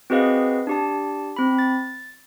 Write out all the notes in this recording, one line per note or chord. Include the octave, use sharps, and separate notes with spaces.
C4 F#4 G#4 B4 D#5 F5
D4 G4 A5
C4 B5
A6